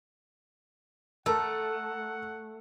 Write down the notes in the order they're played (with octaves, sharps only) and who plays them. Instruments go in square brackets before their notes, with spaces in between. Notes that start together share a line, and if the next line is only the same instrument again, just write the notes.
[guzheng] A3 [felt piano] A4 A#4 A5 [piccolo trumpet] F#5 [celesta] E6